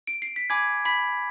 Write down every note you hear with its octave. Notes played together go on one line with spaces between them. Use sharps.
D7
C7
B6
G#5 B5 D6 G#6
B5 B6